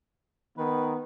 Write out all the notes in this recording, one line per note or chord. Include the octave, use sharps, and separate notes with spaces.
D#3 B3 B4